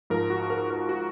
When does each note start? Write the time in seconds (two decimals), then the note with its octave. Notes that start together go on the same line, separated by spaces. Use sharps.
0.10 G#2 F3 A#4
0.30 F#4
0.50 A#4
0.70 A#4
0.89 F#4